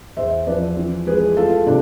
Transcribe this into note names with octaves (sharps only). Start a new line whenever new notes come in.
E2 C5 E5
F3 B4 D5
E3
G#3 G#4 B4
A3 F4 A4
C3 D4